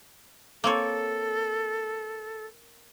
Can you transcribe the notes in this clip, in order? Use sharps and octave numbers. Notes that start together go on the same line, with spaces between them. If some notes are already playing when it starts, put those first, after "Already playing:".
A#3 C4 A4 C#5